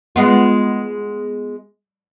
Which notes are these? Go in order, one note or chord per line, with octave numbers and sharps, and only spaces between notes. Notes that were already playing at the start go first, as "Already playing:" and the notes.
G#3 B3 F4